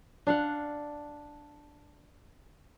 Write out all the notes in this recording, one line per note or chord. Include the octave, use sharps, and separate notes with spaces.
D4 F5 F#5